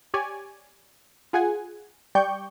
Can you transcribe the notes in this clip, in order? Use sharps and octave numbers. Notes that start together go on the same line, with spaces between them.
G4 C#5 D5 G#5
F4 G#4 F#5 G#5
G3 D5 G5 C#6 G6